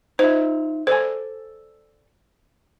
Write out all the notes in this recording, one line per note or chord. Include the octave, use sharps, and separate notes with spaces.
D#4 F4 C5 E5
A4 C5 D5 G#5